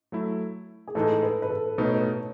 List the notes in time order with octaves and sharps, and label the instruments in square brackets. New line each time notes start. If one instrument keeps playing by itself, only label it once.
[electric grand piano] F#3 A3 E4
[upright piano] G#4
[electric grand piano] A2 E3 G#3 D#4 [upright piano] A4
[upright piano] B4
B4
A4
[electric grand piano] B2 A3 D#4 [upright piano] B4
[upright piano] C#5
B4